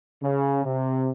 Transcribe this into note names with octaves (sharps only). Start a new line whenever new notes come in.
C#3
C3